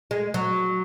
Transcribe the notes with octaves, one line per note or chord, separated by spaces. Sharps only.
G#3
F#3